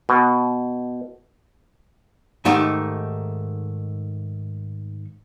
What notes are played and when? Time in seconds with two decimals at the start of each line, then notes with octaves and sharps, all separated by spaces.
0.09 B2
2.45 G#2 D#3 A3 G4